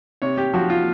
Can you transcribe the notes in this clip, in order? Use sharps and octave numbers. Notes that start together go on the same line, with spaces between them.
C3 C#5
G4
F3 F#4
F4